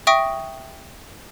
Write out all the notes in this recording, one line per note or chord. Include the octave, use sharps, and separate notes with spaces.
E5 G5 C#6 D#6 A#6 D7